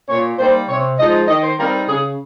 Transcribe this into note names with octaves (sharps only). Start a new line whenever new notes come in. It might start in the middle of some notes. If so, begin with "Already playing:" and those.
A#2 C#5
G3 A#3 D#4 C5
C3 C#5
F3 G#3 D#4 D#5
D#3 D#5
C5
G3 C4 D#4 A#4
A#4
C#3 G#4